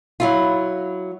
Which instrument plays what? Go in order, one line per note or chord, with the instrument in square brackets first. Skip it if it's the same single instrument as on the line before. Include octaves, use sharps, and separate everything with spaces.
[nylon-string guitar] F#3 E4 F4